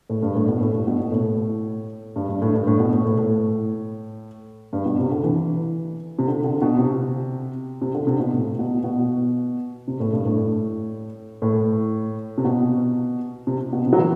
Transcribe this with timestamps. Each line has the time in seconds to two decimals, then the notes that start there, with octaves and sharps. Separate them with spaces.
0.10 A2
0.23 G2
0.35 A2
0.48 B2
0.61 A2
0.74 G2
0.87 B2
1.00 B2
1.12 A2
2.16 G2
2.29 G2
2.42 A2
2.54 G2
2.67 A2
2.80 B2
2.93 A2
3.05 A2
3.18 A2
4.73 G2
4.86 B2
4.99 C3
5.11 D3
5.24 E3
6.19 C3
6.27 D3
6.44 D3
6.62 B2
6.78 C3
7.82 C3
7.94 D3
8.07 C3
8.20 B2
8.33 A2
8.59 B2
8.84 B2
9.88 C3
10.00 A2
10.13 G2
10.25 A2
11.42 A2
12.38 C3
12.45 B2
13.47 C3
13.73 B2
13.86 C3
13.93 F#3
13.99 E3